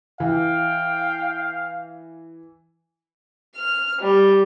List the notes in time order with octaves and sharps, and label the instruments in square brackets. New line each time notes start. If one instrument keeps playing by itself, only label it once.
[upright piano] E3 [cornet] F5 [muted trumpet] G5
[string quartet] F6
G3